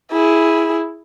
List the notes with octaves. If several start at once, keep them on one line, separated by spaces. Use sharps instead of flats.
E4 G#4